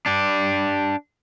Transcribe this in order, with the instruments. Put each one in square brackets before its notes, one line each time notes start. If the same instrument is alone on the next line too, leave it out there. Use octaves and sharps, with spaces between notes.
[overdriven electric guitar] D4 G4